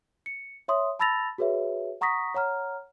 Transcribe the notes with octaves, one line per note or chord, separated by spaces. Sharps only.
C#7
C#5 E5 C6 D#6
A5 B5 E6 A6 A#6 F7
F#4 G#4 B4 C#5 E5
F#5 A#5 C#6 D#6 A#6 B6
C#5 F#5 A#5 F6